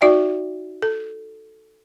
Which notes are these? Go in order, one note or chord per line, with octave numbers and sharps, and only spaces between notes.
D#4 F#4 D5 E5 G5
A4